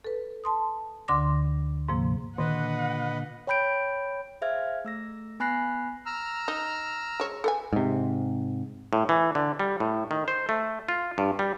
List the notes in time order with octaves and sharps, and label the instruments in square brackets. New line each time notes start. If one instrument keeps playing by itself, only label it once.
[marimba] A4 B4
A5 C6 D#6
D2 D3 C6 D6 A#6
G#2 C3 F3 A#3
[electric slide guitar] A#2 D3 [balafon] D#3 [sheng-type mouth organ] B4 D#5 [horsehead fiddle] F#5
[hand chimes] C#5 G5 B5 G6 D7
G#4 C5 E5 F5 F6 G#6
A3 E6 A#6
B3 G#5 B5 F#6 A#6 C7
[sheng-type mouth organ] A#5 E6 F6
[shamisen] D#4
G#3 C#5
A4 B4 G#5
[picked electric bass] G#2 C3
[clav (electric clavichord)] A2
E3
D3
G3
A2
D#3
C5
A3
F4
G2
G3